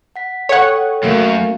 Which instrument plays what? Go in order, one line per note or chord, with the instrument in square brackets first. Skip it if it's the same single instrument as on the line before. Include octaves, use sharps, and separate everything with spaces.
[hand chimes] F#5 B6
[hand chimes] A4 G5 [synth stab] C#5 F#5
[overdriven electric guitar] F#2 [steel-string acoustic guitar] A3 A#3 F#4